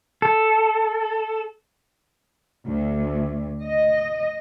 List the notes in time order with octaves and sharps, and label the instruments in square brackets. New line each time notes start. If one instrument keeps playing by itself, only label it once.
[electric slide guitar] A4
[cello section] D2
D#5